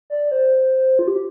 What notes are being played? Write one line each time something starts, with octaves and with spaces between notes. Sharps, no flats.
D5
C5
F4
G4